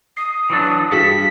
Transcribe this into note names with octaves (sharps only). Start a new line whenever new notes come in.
D#6 C7
E3 F#3 D4
G2 F#4 G#4 B6 C#7